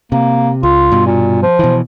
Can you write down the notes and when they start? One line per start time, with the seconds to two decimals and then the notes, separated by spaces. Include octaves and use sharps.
0.12 C3 A#3
0.63 C#2 F4
0.92 G2 B2
1.06 A#2
1.42 F3
1.59 B2 E3